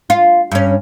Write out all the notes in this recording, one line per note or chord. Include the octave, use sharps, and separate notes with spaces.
F4
G2 C#4